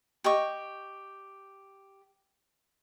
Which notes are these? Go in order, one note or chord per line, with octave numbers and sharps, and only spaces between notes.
G4 D#5 C#6